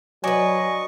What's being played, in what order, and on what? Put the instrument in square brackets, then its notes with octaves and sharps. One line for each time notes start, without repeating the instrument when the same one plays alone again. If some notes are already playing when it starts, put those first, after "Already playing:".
[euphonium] F#3 [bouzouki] D4 B4 [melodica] D#5 C#6 [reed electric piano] G#5